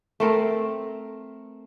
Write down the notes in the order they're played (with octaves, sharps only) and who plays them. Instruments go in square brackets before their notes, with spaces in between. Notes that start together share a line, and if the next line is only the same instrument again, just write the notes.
[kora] A3 C4 A#4